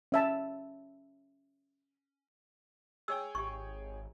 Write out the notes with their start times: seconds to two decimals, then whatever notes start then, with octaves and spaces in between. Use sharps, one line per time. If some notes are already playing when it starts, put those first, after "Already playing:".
0.12 C#4 E5 A5
3.08 G#4 C#5 G5 E6
3.35 G#1 G4 C#6